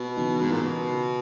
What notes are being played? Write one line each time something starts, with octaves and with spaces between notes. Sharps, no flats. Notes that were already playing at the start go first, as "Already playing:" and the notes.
Already playing: B2
C#3 E3 B3 D#4
G#2
A#2
B2